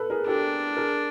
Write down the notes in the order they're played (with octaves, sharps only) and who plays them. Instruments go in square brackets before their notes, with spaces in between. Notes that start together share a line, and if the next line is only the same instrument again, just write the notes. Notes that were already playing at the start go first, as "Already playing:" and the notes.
Already playing: [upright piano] A4 B4
G#4 A#4
[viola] D4 [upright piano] G4 A4
[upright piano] G#4 A#4